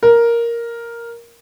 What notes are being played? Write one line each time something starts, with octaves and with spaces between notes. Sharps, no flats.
A#4